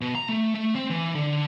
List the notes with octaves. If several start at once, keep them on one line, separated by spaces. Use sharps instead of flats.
B2
A#5
A3
A3
C4
E3
D3